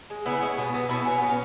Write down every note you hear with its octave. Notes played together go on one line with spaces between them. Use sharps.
G#3
C#3 B3 E4
G#3 C#4
B2 B3
F#3 B3
B2 B3 E4
F#3 C#4
B2 B3
C#4